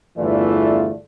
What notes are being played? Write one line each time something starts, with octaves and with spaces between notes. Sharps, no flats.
G1 E2 E3 A3 F4 D5